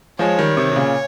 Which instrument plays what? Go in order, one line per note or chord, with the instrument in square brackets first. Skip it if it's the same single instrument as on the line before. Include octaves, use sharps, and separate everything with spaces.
[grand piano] F3 G#3 [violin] C#5
[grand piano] D#3 G3
C3 D#3
C3
A#2 C#3